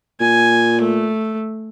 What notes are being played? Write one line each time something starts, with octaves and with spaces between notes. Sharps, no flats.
A#2 G#5
A3